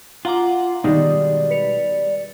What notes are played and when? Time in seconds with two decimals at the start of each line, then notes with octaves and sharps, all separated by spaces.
0.25 F4 F#5 A#5 D6
0.84 B2 D#3 G3 G#3 D#4 D5
1.50 B4 C#7 F7